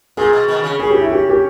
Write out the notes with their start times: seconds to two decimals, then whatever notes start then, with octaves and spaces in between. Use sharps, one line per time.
0.17 A#2 G#4
0.33 B2
0.48 B2 D#3
0.64 C#3
0.79 C#3 G#4
0.90 G4
1.01 E4
1.11 G4
1.29 G4